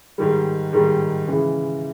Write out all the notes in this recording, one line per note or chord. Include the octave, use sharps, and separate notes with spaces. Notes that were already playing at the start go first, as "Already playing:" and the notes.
G#2 D#3 G3
G#2 D#3 G3
C#3 E3 G#3